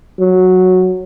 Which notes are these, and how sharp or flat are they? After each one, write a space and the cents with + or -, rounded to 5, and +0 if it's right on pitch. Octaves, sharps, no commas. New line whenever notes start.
F#3 -5